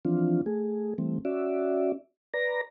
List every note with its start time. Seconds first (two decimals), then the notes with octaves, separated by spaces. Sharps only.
0.05 E3 F3 C4 D4 F4
0.46 A3 G#4
0.98 E3 G3 A3 C4
1.25 C#4 F#4 D5 E5
2.34 B4 D5 A#5 A#6